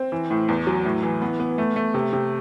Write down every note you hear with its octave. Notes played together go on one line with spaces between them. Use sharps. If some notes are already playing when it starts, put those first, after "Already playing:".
Already playing: C4
E3
A2
E2
F#3
A2
E3
B3
B3
A3
A3
C3
C3